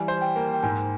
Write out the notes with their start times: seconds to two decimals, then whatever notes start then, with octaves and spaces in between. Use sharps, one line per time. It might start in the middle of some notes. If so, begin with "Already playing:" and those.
Already playing: E3 G3 G#5
0.08 C5
0.21 G5
0.36 A#3
0.53 G5
0.63 G#2 G#5